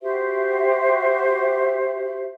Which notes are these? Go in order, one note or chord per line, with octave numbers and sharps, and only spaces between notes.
F#4 G4 C5 E5